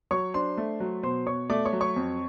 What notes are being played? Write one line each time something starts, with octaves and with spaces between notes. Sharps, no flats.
F#3 C#5 C#6
D4 C5 C6
A3
F#3
B2 C5 C6
B2 C#5 C#6
A3 D5 D6
C#5 C#6
F#3
C#5 C#6
F2